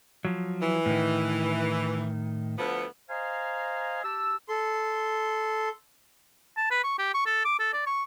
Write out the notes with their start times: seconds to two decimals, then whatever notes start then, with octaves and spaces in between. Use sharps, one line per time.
0.25 F3 F#3
0.62 E3
0.86 A2 D#3
2.59 D2 F3 B3
3.09 C5 D#5 F5 G#5 A#5
4.03 G4 A5 E6
4.48 A4 C6
6.57 A5
6.71 B4
6.84 C#6
6.99 G4
7.14 C#6
7.26 A4
7.45 D6
7.59 A4
7.73 D5
7.86 C#6